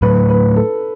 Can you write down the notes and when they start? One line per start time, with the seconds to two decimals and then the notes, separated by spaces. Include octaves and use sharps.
0.02 A2 F#3 A3 B4
0.29 B4
0.56 A4